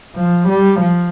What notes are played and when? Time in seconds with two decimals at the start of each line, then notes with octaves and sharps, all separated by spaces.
0.16 F3
0.49 G3
0.81 F3